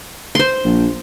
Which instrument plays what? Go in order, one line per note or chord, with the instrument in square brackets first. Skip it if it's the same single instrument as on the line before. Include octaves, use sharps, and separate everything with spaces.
[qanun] C5 C6
[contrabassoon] A#1